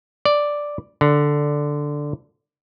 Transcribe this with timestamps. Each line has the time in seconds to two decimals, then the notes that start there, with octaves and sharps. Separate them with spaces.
0.25 D5
1.01 D3